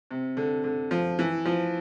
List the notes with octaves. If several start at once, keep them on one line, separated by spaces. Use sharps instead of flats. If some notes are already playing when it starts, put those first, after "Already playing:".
C3
D3
D3
F3
E3
F3